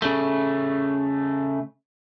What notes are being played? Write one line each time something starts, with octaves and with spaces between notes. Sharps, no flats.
C#3 A3